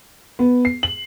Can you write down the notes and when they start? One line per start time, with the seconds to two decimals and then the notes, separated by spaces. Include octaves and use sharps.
0.39 B3
0.65 C7
0.83 F#7